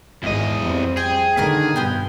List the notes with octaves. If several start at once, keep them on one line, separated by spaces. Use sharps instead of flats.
G#1 E2 G#3 D#5
F2 G3 C4
G#4 G5
D3 D#3 A#3 B3 A#4
G2 B2 F3 B3 G5